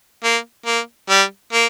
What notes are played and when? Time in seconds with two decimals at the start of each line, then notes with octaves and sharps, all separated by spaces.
0.24 A#3
0.66 A#3
1.09 G3
1.53 A#3